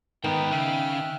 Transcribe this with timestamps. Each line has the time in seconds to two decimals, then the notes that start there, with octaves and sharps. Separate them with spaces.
0.24 G#2 D#3 B3 D#4 A#4 B4 G5
0.51 C#3 E5 F6 F#6